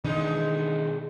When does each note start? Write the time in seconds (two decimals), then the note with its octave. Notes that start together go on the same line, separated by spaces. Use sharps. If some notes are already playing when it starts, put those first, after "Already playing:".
0.04 B2 D#3 E3 G#3 D4 D#4